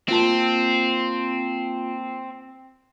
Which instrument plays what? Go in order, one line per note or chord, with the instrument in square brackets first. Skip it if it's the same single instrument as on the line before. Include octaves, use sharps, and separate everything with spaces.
[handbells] A#3 F4 A5 [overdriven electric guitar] C4